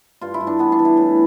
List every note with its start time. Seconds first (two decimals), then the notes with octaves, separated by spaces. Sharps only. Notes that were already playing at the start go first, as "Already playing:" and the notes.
0.21 G2 F4
0.34 E4
0.41 G2
0.47 D4
0.59 E3 B3
0.72 D4
0.79 E3
0.85 E4
0.97 A2